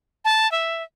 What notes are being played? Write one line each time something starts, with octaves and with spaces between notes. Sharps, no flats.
A5
E5